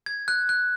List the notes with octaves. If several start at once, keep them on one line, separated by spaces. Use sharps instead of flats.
G#6
F#6
F#6